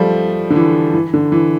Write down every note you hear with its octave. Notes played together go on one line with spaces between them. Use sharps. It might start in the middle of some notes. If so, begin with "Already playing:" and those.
Already playing: F3 G3 A3
D3
E3
E3
D3
E3